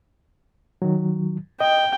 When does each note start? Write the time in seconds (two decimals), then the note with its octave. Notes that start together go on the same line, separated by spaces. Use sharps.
0.82 D#3 F#3
1.61 D#5 G5